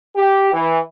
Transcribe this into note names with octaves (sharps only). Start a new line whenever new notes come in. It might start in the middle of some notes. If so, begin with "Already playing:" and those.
G4
E3